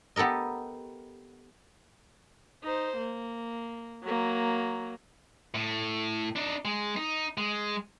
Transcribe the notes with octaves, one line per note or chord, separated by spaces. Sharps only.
B3 G4 A4 A#4 D#5
D#4 C5
A#3
F#3 A#3
A2
D4 D#4
G#3
D#4
G#3